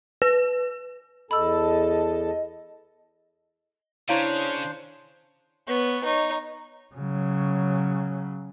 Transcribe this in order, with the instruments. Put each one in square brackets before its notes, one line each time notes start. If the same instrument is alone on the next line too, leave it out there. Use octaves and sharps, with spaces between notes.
[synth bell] B4
[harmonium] E2 A4 A5 [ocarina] D#5 [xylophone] B5 E6
[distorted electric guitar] C#3 [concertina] D4 C5 [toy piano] E4 F5 [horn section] C#5
[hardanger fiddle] B3 C#5
D#4 C#5
[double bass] C#3 F#3